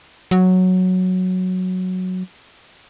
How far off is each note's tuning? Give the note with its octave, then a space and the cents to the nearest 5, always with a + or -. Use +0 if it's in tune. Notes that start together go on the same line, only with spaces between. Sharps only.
F#3 -5